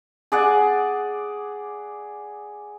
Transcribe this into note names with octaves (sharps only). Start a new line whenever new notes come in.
G#4 D5 F#5